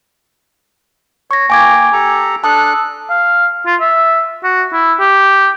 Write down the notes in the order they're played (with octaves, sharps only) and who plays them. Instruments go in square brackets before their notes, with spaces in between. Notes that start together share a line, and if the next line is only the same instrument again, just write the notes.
[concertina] C#5 [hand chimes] C#6 A#6
[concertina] A#3 G5 [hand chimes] G#5 D6 G#6
[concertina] G4 A4 A#5
[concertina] D4 A4 F#6 [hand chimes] A5 D#6 E6
[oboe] F5
F4
E5
F#4
E4
G4